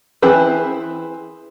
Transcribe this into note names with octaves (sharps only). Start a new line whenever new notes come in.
E3 C4 E4 G#4 B4